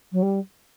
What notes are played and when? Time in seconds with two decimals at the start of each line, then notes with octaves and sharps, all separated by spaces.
0.12 F#3
0.22 G3